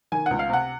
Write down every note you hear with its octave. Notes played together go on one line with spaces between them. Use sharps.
D#3 G#5
C#2 F#5
F5
C3 F#5